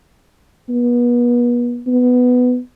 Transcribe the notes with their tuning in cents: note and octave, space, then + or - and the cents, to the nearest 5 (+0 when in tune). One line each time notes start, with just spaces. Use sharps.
B3 -35
B3 +10